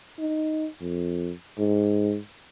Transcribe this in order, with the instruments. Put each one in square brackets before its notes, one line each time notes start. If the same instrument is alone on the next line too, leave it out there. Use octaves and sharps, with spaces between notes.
[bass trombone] D#4
F2
G#2